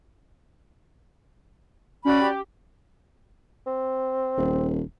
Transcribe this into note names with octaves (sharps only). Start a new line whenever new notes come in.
C#4 F#4 D5 B5
G4
C4
D#1